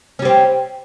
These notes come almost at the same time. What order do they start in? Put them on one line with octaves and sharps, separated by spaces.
C#4 G3 C4